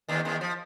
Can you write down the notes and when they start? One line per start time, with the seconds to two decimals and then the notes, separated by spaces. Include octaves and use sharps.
0.09 D#2 D#3
0.25 D#2 D#3
0.41 F3